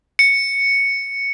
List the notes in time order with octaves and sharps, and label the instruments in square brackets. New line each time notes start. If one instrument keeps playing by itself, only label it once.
[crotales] C#7